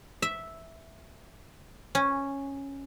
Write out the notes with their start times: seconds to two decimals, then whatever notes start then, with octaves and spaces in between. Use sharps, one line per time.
0.22 E5
1.95 C#4